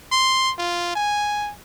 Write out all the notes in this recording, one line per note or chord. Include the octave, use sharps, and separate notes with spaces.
C6
F4
G#5